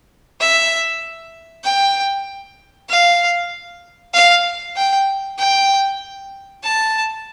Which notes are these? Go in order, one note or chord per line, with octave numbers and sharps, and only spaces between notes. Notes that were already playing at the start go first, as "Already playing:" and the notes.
E5
G5
F5
F5
G5
G5
A5